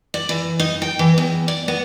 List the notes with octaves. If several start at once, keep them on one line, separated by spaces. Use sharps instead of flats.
D5
E3
D#4
G5
E3
E2
D5
B3